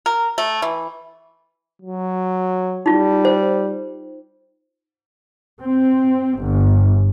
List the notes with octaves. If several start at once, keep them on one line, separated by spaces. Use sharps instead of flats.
A#4
A3
E3
F#3
G3 D#4 F4
C5
C4
G1